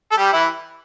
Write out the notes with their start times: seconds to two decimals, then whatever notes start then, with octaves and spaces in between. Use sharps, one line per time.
0.12 A4
0.17 G3 G4
0.33 E3 E4